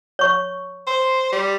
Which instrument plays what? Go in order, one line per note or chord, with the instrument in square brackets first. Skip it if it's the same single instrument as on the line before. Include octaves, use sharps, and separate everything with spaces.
[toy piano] C#5 C#6
[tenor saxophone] C5
G3